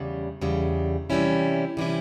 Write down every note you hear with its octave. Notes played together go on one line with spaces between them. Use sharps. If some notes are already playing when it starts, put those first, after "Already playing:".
Already playing: E2 C#3 G3
E2 C#3 G3
C3 E3 G3 C#4 E4
C3 E3 G3 C#4 E4